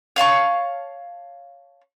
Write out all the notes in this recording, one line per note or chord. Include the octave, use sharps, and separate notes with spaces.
C#5 F5 A5 C#6